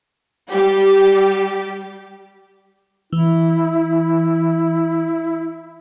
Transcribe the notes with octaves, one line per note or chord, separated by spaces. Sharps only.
G3 G4
E3 E4